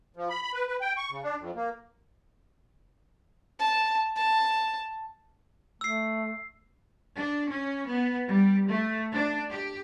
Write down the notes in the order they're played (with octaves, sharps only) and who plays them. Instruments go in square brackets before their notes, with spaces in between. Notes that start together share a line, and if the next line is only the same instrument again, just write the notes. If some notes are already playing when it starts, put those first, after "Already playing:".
[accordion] F3
B5
B5
B4
B4
G5
C#6
C#3
D4
F2
A#3
[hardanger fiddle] A5
A5
[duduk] A3 [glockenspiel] E6 C7
[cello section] D4
C#4
B3
G3
A3
D4
G4